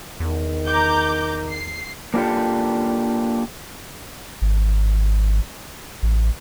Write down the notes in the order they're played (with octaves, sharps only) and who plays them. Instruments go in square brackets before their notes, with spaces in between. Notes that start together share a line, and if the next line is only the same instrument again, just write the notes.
[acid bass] E2 [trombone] D#3
[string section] A#5 D6 G6
C7
[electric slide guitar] A#3 D4 F4 G4 A4
[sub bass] G#1
A1